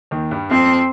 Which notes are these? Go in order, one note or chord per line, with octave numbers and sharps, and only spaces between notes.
D#2 D#3
G2 G3
F2 F3 C4